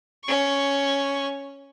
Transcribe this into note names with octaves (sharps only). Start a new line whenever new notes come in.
C#4 C#6